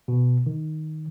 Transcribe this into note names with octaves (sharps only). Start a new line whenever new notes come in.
B2
D#3